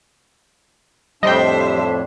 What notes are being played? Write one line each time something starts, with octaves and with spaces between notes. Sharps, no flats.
F2 A2 G3 D4 C5 D#5 E5 G5